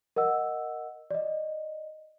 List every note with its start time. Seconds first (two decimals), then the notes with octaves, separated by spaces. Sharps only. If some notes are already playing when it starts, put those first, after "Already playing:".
0.16 A#4 D#5 F#5 E6
1.11 D5 D#5